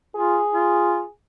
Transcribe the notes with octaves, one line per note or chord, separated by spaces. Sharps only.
F4 G#4
F4